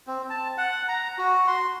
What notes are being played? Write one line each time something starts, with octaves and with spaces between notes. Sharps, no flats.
C4
A5
F#5
A#5
F#4
C6